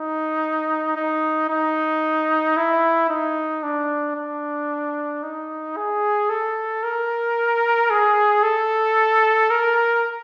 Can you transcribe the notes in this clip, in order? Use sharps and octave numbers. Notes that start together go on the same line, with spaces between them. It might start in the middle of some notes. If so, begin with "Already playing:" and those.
Already playing: D#4
D#4
D#4
E4
D#4
D4
D4
D#4
G#4
A4
A#4
G#4
A4
A#4